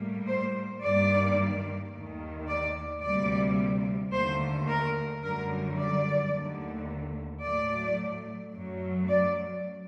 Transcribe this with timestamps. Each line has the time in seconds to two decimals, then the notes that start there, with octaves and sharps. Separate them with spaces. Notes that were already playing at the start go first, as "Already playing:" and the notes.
Already playing: A2 G3 A#3
0.26 C5
0.82 G2 D#3 G3 A#3 D5
1.92 D#2 D#3 A3
2.47 D5
3.02 D2 C3 G3 A#3 D5
4.12 D#2 D3 A3 C5
4.67 A#4
5.23 F#2 D3 G3 A#4
5.77 D5
6.32 D#2 D3 A3
7.42 A2 F#3 A3 D5
8.53 F#2 F#3 A3
9.08 D5